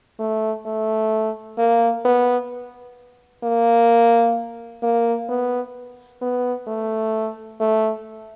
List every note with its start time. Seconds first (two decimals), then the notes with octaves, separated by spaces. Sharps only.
0.20 A3
0.66 A3
1.58 A#3
2.05 B3
3.44 A#3
4.83 A#3
5.29 B3
6.21 B3
6.67 A3
7.60 A3